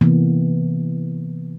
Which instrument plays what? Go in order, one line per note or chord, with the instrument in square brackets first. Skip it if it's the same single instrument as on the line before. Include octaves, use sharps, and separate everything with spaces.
[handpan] C3 E3 A#3 B3